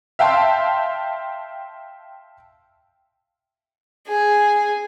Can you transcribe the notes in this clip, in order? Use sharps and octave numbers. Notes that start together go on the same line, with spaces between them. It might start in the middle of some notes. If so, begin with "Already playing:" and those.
E5 F5 G5 A5 C6
G#4 G#5